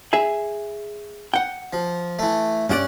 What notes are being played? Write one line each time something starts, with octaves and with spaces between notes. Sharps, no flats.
G#4 E5 G#5
F#5 G5
F3
E3 A3
G2 C#4 G4 D5 F#5